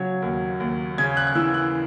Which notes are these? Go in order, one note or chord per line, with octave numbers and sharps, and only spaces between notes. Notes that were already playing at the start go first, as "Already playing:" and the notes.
Already playing: C#3 F#3 G#6
D#2
D#2
C#3 G#6
F#6
F#6
E3 E6
F#6